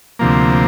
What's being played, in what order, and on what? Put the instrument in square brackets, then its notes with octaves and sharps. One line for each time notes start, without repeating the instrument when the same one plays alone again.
[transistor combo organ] D2 C3 F3 A#3